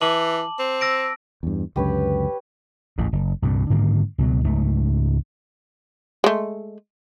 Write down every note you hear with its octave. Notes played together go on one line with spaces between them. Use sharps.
E3 A5 D6 F#7
C4
E6 A#6 D7
E2 G2
C#2 F#2 D3 G4 B4 C#5
A1 D#2 G#2
F#1
C2 G2 A#2
G#2 D3 D#3 A#3
C#2 B2 F#3
C#2 G#2 A3
G#3 A3